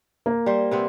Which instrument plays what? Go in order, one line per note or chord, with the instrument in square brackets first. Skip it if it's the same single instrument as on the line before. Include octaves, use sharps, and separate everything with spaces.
[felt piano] A#3
[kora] G3 C5
C3 B3 C4